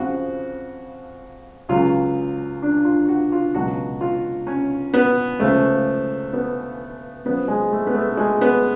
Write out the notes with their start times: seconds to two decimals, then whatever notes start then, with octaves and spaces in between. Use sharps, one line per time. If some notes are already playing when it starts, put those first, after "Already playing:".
Already playing: F2 C#3 F3 F#4
1.69 C#2 C#3 F#3 F4
2.62 D4
2.85 F4
3.08 F#4
3.32 F4
3.54 C#2 B2 F#3 F#4
4.01 F4
4.47 C#4
4.94 B3
5.40 C#2 C#3 F3 A3
6.33 B3
7.25 F#2 B3
7.30 F3
7.48 G#3
7.72 A3
7.87 B3
7.95 A3
8.17 G#3
8.41 B3